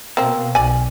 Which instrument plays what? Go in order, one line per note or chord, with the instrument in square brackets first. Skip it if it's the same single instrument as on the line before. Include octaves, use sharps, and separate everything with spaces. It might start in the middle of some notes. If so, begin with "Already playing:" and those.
[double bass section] B2 [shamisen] A#3 C4
[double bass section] B1 [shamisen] D5 G#5